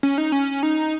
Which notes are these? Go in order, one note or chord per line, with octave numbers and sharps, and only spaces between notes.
C#4
D#4
C#4
D#4